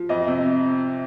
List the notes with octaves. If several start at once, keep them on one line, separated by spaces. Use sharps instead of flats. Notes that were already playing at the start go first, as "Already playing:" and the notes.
Already playing: F3
F2 D#5
C3